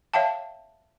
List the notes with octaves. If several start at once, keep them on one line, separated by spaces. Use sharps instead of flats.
C#5 E5 F5 G5 A5